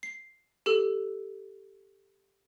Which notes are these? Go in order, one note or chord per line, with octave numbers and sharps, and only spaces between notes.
C7
G4 A4 E6